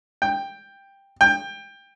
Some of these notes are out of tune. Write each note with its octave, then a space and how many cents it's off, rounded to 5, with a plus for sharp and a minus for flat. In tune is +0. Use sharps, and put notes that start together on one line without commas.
G5 +10
G5 +20